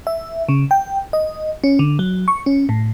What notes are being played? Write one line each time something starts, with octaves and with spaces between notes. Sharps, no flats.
E5
C#3
G5
D#5
C#4
D3
F#3
C#6
C#4
A2